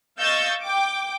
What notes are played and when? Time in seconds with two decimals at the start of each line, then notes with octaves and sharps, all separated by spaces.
0.19 D#5 F5 C#6 E6 G6 A6
0.62 G5 D6